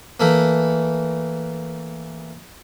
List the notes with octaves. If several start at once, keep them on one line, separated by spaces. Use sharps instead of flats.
E3 A3 A#3